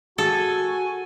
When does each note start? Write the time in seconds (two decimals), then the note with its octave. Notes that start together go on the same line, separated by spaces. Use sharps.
0.18 F#4 G#4 A4 G#5